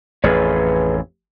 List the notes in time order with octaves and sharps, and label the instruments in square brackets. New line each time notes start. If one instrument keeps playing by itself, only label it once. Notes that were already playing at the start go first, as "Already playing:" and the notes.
[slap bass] A1 F2 [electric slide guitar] G#4 B4 C#5